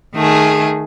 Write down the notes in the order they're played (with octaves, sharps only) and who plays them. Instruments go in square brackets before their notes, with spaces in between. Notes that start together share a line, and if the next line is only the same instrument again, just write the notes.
[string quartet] D#3 A3 G#4